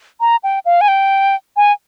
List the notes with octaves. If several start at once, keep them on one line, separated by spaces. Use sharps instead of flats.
A#5
G5
F5
G#5
G5
G#5